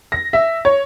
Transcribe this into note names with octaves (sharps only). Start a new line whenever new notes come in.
A#6
E5
C#5